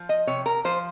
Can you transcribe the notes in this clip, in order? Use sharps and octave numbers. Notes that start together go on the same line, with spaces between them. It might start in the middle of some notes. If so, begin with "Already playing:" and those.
Already playing: F3
D#5
C3 C#5
A#4
F3 C5